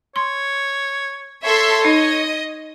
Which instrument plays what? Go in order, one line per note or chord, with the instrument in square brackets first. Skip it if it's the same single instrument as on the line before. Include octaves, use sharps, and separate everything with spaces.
[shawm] C#5 [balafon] C6
[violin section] A4 E5 C6 [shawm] C#5
[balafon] D#4 [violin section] D#5